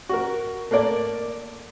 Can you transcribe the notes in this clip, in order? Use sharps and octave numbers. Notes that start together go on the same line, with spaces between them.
F#4 A#4
A3 A#3 A#4 D5